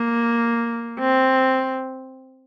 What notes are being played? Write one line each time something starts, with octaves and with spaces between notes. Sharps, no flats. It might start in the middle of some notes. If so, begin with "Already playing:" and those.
Already playing: A#3
C4